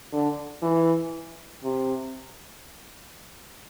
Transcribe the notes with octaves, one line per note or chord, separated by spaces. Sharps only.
D3
E3
C3